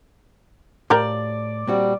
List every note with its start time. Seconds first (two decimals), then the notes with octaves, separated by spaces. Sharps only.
0.90 A2 F3 G4 A#4 D5
1.67 A#2 G3 C4 F#4